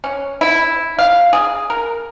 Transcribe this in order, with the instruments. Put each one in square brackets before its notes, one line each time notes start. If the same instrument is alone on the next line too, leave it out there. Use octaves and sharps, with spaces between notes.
[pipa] C#4
E4
F5
G#4
A#4